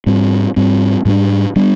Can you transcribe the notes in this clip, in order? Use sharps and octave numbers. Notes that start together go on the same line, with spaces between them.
G#2 G3 C4
G#2 G3 C4
G#2 G3 B3 D4
G3 B3 D4